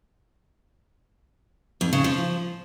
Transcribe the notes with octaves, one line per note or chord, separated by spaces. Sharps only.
F2
C#3
F3